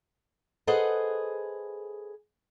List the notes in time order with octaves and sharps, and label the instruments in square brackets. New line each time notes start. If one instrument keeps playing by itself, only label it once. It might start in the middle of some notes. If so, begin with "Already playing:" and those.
[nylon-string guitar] G#4 A4 B4 C5 D#5 F#5